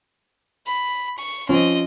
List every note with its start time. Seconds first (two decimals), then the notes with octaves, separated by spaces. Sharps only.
0.66 B5
1.18 C#6
1.49 F3 C4 C#4 D#5